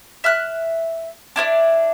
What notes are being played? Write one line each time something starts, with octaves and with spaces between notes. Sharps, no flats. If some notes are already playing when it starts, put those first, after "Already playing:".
E5 F6 F#6
D4 E4 C5 D5